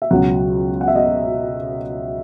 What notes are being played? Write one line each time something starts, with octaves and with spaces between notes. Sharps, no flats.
E5
C#2 B2 F#3 F#5
F#5
E5
D#5